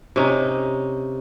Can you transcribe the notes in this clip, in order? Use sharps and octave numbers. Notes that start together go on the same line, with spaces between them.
C3 C#4 D#4